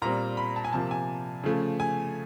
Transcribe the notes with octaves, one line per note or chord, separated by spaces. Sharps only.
A#2 G3 C4 A#5
B5
A5
G#5
C3 F3 A#3 A5
G#5
C#3 F3 A3
G#5